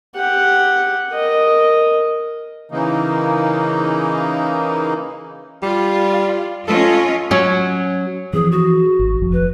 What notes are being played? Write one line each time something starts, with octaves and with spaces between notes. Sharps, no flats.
G4 F#5
A#4 D#5
C#3 E3 A#3 D#4
G3 F4
C#4 F4 A4 D#5
F#3 C#4
E3 F3 C4 G#4
F#4
G#1
F1 F3
B4